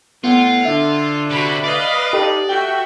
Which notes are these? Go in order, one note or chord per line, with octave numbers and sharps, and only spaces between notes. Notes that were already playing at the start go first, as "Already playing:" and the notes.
A2 B3 F4 F#5
D3 E5
C3 F#4 B5
B4 D5 D#5 F5
D#4 G4 A4
F#4 E5 G5